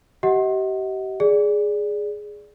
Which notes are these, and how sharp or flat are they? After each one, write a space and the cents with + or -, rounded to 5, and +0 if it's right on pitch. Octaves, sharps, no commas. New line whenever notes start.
G4 -35 D#5 +35 F#5 +0
G#4 +0 D5 -5